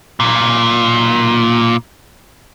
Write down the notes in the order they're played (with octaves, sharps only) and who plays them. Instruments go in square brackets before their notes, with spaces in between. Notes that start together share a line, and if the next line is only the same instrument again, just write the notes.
[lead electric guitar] B1 A#2